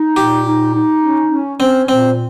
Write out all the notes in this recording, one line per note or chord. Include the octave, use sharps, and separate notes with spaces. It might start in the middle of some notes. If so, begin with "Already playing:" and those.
Already playing: D#4
A#2 G4
D#4
D#4
C#4
C#4
C4 C#4
A#2 C4